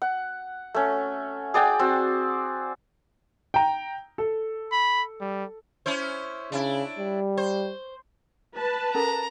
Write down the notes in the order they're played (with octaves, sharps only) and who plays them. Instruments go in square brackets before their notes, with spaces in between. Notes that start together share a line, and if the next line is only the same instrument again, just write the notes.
[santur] F#5
A3 C#4
G#4 D5 F#5 G5
C4 F#4
[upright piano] G5 A#5
A4
[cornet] B5
G3
[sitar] C#4 E4 C5
[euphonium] C#3 [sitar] D4 E4
[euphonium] G3
[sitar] C5
[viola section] B4 A5
[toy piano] C#4 A4 A#4 [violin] A#5